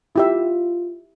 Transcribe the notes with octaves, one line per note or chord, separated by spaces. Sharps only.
E4 F4 G4 E5